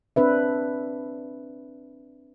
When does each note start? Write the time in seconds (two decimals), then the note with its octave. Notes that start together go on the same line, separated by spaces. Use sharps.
0.16 C4 D4 B4 E5